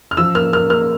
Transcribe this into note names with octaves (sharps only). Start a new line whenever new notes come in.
F6
F3 E6
A#3 F6
A#3 F6
A#3 F6